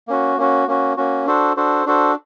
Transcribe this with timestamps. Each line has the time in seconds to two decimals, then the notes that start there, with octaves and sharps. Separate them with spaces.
0.08 A#3 C#4 F#4
0.37 A#3 C#4 F#4
0.68 A#3 C#4 F#4
0.97 A#3 C#4 F#4
1.27 D4 F#4 A4 C5
1.57 D4 F#4 A4 C5
1.86 D4 F#4 A4 C5